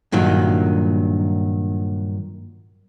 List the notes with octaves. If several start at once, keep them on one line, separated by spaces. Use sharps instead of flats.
G2 A#2 D#3 F#3